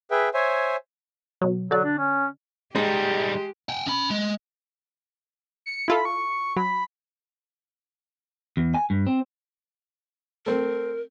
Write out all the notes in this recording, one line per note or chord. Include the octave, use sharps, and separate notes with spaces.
G#4 B4 E5 G5
C5 C#5 E5 G#5
B2 F#3
D3 F#3 F#4 D5
D4
C#4
G3 G#3 D#4 G4
F#5 G5
C#4 B5
G#3
C#7
E4 F4 A4 B5
C#6
F#3 B5
E2
G#5
G2
C4
A3 C4 A#4